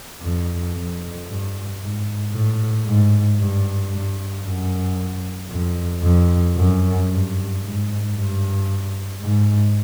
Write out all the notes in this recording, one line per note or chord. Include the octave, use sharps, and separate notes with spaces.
F2
F2
G2
G#2
A2
G#2
G2
G2
F#2
F2
F2
F#2
G2
G#2
G2
G#2